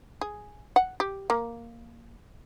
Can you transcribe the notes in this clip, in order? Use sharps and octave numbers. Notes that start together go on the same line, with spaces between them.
G#4
F#5
G4
A#3